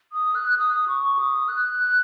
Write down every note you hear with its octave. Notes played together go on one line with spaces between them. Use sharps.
D#6
F#6
D#6
C#6
D#6
F#6